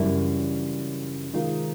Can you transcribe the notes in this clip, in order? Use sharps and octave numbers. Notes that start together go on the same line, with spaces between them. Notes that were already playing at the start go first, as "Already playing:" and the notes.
Already playing: F#2 C#3 E3 G3 D4 E4
C3 D#3 G#3 D#4 F4